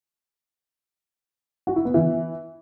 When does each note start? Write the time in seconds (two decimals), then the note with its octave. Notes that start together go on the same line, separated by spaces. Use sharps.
1.67 F#4
1.76 E4
1.85 B3
1.94 E3